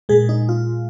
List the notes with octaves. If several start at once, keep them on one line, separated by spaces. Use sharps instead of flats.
A#2 G#3 G#4
D#4
F4